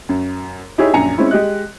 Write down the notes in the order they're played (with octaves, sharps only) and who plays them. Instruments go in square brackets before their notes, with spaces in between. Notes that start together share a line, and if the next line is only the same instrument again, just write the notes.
[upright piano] F#2
D#4 E4 G4 G#4 C#5
A#1 F#2 G#5 A#5 C#7
G#3 C4 C#4 E4
G#3 G4 D#5 F#6